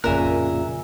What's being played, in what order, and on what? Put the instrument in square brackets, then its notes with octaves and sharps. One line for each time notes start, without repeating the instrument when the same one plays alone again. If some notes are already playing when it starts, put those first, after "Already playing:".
[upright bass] A1 F2 [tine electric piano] A#2 C#3 [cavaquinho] A#4 E5 [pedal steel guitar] G#5 F#6